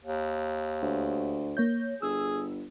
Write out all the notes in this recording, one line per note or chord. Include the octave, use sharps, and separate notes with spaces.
D#2
D2
A#3 C#5 G6
G1 G#4 E6